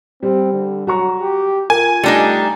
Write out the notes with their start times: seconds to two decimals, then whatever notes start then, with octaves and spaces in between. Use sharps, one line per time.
0.23 G3 C4
0.53 D3
0.87 F#3 F#4 A#5 C#6
1.21 G4
1.70 F4 A#4 G#5
2.04 G3 A3 D4 D#4 A#6